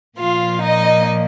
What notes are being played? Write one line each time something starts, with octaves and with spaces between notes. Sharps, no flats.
A#2 F3 A#3 F4 F5
D#4 D#5